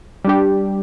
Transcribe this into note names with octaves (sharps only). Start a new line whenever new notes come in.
G3 D4 G4